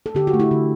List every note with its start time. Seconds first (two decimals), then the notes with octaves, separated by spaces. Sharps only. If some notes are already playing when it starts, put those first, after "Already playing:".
0.06 A4
0.15 D3 G4
0.27 F#4
0.34 A3
0.40 E4
0.51 D3